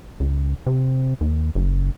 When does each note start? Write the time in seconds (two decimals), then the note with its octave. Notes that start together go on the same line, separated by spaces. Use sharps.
0.20 C#2
0.67 C3
1.21 D#2
1.55 F#1